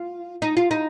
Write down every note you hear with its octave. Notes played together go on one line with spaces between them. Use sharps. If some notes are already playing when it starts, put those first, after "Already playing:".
Already playing: F4
D#4
F4
D#4